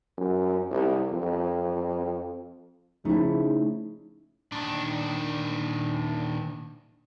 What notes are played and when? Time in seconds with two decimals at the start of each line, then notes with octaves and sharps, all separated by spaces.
0.18 F#2
0.71 C2
1.11 F2
3.05 C#3 F3 A3 D#4 E4
4.52 A#2 D#3 D4